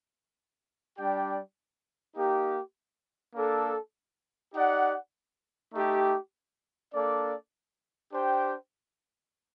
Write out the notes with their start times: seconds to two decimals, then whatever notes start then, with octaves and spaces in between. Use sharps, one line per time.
0.96 G3 D4 G4 D5 G5
2.16 A#3 D#4 G4
3.35 A#3 D4 A4
4.54 D#4 G4 D5 F#5
5.74 A3 D#4 G4
6.93 A#3 D4 A4 D5
8.13 D4 G4 C5 G5